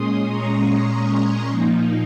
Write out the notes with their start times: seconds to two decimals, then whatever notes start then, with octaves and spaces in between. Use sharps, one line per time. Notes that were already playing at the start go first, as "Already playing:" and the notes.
Already playing: A#2 G#3 C#4 C6 D#6
0.29 A#5 C#6
0.69 A#5 C#6
1.49 A#2 F3 A#3 D#4